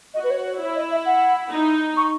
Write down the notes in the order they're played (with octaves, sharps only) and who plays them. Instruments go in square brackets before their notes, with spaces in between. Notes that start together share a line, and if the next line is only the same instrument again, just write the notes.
[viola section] F#4 [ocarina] D#5
[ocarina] B4
C#5
C#5
[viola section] E4 [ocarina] C#5
[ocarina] D#5
E5
F#5
[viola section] D#4
[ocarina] C#6